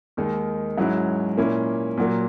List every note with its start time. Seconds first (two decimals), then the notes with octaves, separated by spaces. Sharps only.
0.17 D#2 D#3 G#3 D#4
0.78 G#2 F#3 C#4 E4
1.38 A#2 A#3 C#4 E4
1.98 A#2 F#3 A#3